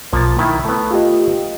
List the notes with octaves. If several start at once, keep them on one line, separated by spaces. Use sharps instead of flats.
B1 F3 A#3 A6
D#3 E4 B5
A3 B3
F4 G4 D#5